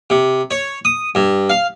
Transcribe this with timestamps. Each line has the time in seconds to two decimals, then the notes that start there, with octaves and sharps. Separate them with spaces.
0.10 C3
0.51 C#5
0.85 D#6
1.15 G2
1.50 F5